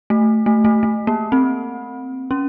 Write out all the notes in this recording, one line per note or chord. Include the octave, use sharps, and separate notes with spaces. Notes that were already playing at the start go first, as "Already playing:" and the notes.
A3
A3
A3
A3
A#3
C4
C#4